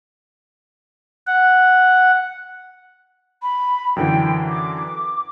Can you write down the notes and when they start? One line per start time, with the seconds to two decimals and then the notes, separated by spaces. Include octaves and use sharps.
1.27 F#5
3.42 B5
3.96 F#2 D3 E3 G5
4.49 D6